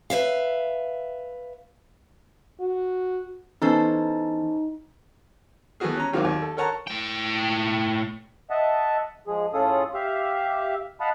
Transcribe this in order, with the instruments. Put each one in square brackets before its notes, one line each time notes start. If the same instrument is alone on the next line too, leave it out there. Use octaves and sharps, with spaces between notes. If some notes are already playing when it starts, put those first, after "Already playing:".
[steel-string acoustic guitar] B4 C#5 E5 F5
[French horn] F#4
[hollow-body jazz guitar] E3 B3 A5 [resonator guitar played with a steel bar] C#4 A4 C5 [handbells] D#4
[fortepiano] E3 G3 A3 B3 F#4 G#4
C#4 A#5
G#1 D#3 F#3 C4 F4 D6
D#2
A4
A4 A#4 C#5 F#5 A5 A#5
[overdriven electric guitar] A2 G5
[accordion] D#5 E5 F#5 A5
F3 G#3 G#4
A2 C#4 F4 G#4 A4 D#6
G4 E5 F5
D#5 F5 F#5 A5 B5